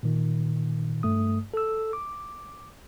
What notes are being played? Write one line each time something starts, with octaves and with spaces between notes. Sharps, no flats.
A#2 D#3
G2 A3 D#6
A4 E6
D6